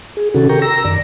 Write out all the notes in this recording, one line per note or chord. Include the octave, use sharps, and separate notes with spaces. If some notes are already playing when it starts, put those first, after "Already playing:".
G#4
C3 D#3 C#4 F#4 A4
G4 A#4 G5 A#5 C#6
A#5 E6 A#6
F#2 D#3 D5 A#5